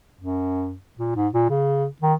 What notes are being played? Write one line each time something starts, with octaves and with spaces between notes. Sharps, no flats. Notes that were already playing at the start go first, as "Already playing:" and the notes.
F#2
A#2
G#2
A#2
C#3
D#3